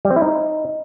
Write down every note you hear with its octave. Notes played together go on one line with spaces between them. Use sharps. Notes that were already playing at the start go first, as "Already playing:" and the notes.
G3
C4
E4
D#4